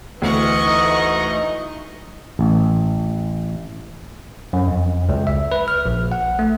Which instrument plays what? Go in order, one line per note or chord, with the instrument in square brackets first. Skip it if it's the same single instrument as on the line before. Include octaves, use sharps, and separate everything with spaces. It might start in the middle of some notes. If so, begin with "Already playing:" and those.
[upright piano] D2 [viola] E3 D#5 [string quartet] F#5 C#6
[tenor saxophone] D#4
[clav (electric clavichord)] A1
[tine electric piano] F#2
F2
C#2
E5
B4
F6
A#1
F#5
A3